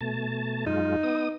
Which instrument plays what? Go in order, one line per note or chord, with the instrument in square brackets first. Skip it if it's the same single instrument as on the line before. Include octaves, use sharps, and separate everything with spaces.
[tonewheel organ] B2 A3 A5
[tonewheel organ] F#2 G#3 F4 [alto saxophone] D#4
[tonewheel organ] B3 D#6